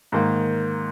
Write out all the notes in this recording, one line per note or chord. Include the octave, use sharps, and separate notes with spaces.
G#2 D#3 A#3